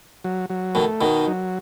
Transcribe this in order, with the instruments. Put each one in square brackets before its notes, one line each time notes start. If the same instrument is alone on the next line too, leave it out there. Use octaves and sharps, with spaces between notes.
[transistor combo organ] F#3
F#3
[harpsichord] B2 D#3 [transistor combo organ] A3
[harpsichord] B2 D#3 [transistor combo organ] D#4
[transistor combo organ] F#3